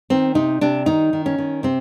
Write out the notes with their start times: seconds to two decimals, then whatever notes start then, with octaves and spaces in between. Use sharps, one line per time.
0.10 D#3 C4
0.35 C3 D#4
0.61 C3 D4
0.86 D#3 D#4
1.13 D#3
1.26 C#4
1.38 D#3
1.63 C3 C4